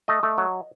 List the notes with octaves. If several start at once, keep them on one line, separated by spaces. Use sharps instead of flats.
A3 D#5
A3
F#3